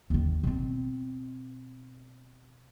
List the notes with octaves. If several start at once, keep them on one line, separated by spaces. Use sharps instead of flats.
D#2 D#3
B2 C4